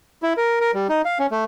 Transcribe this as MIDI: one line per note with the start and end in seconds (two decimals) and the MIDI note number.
0.23 0.33 64
0.37 0.59 70
0.61 0.71 70
0.74 0.87 55
0.89 1.02 63
1.05 1.18 77
1.19 1.27 61
1.31 1.44 57